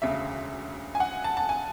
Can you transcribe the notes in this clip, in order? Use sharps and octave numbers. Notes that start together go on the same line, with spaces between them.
E1 D2 C#3 E5
G#5
F#5
A5
A5
G#5